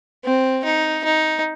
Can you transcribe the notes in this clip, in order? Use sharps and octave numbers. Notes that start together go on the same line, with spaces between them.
C4
D#4
D#4